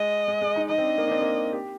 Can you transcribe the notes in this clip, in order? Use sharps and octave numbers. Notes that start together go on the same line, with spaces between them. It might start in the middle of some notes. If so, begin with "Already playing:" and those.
Already playing: G#3 D#5
G#3
G#3
D#4
D#4 D#5
C4
D4
A#3
D4
C4
A#3
G4